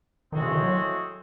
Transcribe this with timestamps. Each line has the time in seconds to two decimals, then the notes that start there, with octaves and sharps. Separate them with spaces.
0.32 A2 D#3 G#3 C4 F#4
0.42 C#3
0.52 D#3
0.63 F#3